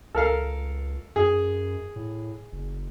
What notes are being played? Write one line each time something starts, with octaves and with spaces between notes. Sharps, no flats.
C#2 A4 A#4 F5
F#2 G#4
A2
F#1